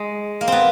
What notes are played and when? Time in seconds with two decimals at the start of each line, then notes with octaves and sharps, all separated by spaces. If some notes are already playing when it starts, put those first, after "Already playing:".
Already playing: G#3
0.41 A#3
0.48 B3 C4